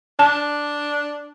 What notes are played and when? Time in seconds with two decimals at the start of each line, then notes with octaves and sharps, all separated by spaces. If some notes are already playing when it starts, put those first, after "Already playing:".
0.19 D4 A5